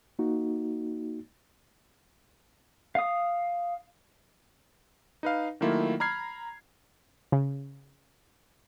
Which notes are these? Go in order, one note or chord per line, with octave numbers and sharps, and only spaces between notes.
A#3 D#4 F#4
F5 D#6
D#4 B4 F5
D#3 F#3 A3 A#3 E4 F4
A#5 B5 F6 G#6 C7
C#3